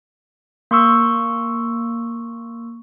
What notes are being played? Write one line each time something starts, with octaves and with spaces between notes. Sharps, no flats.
A#3 C6 C#6 E6